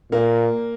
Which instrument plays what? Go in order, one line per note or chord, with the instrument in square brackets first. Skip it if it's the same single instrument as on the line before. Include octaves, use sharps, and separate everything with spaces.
[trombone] A#2 [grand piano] A#3